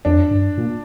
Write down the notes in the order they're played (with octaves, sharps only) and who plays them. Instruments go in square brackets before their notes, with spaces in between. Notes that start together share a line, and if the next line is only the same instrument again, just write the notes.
[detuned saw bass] F2 [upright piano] D4
[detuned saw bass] G2
A#2